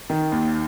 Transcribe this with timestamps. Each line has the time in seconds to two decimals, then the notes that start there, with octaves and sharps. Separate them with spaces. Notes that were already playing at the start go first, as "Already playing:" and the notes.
0.10 D#3
0.32 D#2